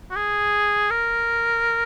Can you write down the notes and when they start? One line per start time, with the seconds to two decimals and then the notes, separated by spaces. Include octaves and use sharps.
0.10 F#4
0.16 G#4
0.91 A#4